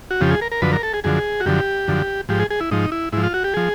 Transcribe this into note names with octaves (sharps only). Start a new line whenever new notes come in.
F#4
F2 C#3 F3 G4
G#4
A#4
A#4
F#2 D3 F3 B4
A#4
A4
G#4
F#2 D3 F3 G#4
F#4
F#2 D3 F3 G4
F#2 D3 F3
G#2 F3 G4
G#4
G#4
E4
G#2 F3 D#4
E4
G#2 F3 E4
F4
F#4
G4
F3 G#4